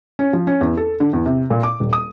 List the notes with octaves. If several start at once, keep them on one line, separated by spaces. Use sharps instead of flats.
C#4
F3
C#4
E2
A4
D3
E2
C3
A#2
D6
D#1
D#6